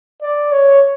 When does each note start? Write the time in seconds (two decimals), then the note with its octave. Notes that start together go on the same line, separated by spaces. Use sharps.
0.22 D5
0.52 C#5